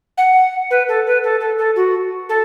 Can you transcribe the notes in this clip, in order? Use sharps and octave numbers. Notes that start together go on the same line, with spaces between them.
F#5
B4
A4
B4
A4
A4
A4
F#4
A4